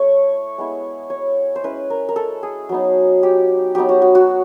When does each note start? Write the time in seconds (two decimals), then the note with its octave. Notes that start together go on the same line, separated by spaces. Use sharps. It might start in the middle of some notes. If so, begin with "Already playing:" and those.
Already playing: A3 E4 C#5
0.58 G#3 B3 E4
1.10 C#5
1.56 C5
1.63 G#3 C#4 E4 B4
1.90 A#4
2.09 A#4
2.16 A4
2.43 G#4
2.69 F#3 B3 D#4
3.23 G4
3.75 F#3 B3 D#4 G4
3.89 F#4
4.02 F#4
4.15 F#4